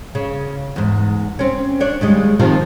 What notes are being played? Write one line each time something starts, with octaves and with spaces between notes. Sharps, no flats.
C#3
E2 G#2
C4 C#4
D4 C#5 D5
D#2 G3 G#3
C3 D#3 F3